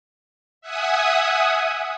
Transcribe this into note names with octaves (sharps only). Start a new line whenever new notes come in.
E5 F#5 G#5 D#6